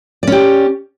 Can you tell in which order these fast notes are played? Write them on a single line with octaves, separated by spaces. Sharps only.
D5 C#4 G4